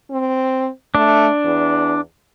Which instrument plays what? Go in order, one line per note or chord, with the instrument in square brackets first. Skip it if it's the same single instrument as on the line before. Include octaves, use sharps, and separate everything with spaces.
[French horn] C4
[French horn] A3 [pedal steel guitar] D4
[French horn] E2